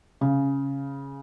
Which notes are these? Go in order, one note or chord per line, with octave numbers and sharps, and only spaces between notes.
C#3